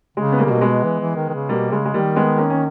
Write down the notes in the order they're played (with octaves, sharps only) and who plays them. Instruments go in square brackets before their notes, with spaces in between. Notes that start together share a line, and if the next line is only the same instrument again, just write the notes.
[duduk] C#3 [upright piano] G#3
[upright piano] B3
G3 A#3
[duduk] C#3
[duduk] B2 [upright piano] A#3
[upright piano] G#3 B3
[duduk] E3
E3
D#3
D#3
C#3
[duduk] B2 [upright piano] G3 A#3
[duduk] C#3 [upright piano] G#3
[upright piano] G#3
[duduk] D#3 [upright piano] G3 A#3
[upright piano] G#3 B3
A#3 C#4
C#4